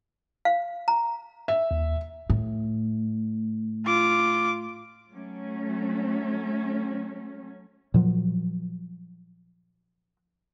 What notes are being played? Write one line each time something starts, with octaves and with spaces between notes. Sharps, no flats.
F5
A#5
E5
D#2
A2
F4 D6
F#3 A3 C#4
A#2 F3 F#3